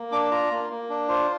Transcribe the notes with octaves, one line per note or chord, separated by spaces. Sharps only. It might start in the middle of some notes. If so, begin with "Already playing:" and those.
Already playing: A#3
D4 D6
F4 A#5
A#3
A#3
D4
F4 C5